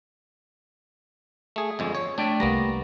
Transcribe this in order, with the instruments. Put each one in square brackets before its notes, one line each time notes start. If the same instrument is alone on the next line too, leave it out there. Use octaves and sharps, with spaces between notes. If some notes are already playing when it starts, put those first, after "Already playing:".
[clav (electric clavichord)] A3 G#4
G1 F2 G#3
C#5
[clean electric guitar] A3 G5 [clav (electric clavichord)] D4
[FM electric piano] C2 G3 [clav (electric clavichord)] A#3 B3 A#5